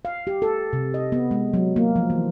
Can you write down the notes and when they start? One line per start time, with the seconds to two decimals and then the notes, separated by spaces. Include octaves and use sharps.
0.05 F5
0.27 G4
0.42 A4
0.73 C3
0.94 D#5
1.12 B3
1.31 G#3
1.54 F#3
1.76 A#3
1.96 F3
2.10 E3